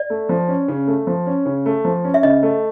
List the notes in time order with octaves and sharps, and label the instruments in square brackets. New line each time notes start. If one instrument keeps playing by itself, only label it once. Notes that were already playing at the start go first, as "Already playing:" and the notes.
Already playing: [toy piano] D5
[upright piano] A3
F3
C#4
C#3
A3
F3
C#4
C#3
A3
F3
C#4
[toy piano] E5
[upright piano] C#3 [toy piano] D#5
[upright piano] A3